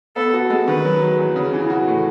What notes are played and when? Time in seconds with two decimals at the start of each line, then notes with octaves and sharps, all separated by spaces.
0.16 B3 A4
0.34 F#4
0.50 G#3
0.68 D#3 B4
0.85 F#3
1.02 F#3
1.18 E2
1.36 C#3
1.53 E3
1.70 F#4
1.88 A2